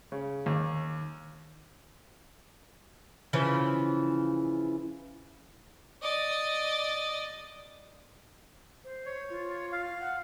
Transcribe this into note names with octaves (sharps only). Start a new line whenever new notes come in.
C#3
D#2
C#3 E3 F3
D5 D#5
C5
C#5
F4
F5
F#5